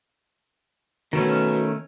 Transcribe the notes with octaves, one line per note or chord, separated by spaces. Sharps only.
B2 D#3 A3 C#4